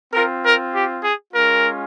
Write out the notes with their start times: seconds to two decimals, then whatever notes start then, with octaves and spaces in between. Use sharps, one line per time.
0.14 C4 F4 A#4
0.44 A#4
0.73 G4
1.03 G#4
1.33 G#3 C#4 F4 A#4